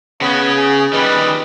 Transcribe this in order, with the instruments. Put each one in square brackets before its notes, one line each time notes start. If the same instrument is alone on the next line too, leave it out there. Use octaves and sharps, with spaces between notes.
[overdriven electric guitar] C#3 C#4 [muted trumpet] B3
[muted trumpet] G#4
[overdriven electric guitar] D#3 G3 [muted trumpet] B4